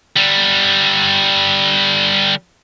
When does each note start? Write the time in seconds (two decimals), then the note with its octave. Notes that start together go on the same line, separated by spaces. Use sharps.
0.16 D3 G3